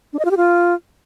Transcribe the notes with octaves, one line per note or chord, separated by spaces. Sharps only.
D4
D#5
F4
G4
F4